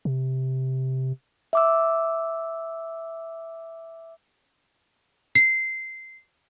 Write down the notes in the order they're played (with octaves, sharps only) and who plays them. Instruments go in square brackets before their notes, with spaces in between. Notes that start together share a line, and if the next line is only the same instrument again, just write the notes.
[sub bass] C3
[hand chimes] E5 D6 E6
[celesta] C7